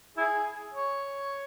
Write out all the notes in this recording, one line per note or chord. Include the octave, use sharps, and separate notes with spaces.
E4 G#4
C#5